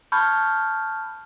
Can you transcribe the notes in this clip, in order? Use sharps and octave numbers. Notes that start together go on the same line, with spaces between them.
A5 B5 C#6 F6 G6 G#6